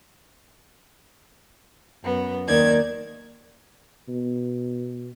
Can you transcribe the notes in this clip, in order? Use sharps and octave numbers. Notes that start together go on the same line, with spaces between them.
F#2 B3
D#2 D#3 D5 G#6
B2